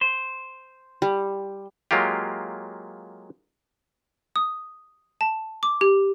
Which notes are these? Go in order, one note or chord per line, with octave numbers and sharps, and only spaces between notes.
C5
G3
F#3 G#3 A#3 F4 G4
D#6
A5
D6
G4